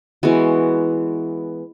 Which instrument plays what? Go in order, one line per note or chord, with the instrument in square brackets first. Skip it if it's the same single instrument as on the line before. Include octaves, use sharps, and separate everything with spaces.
[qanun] E3 G#3 B3 F#4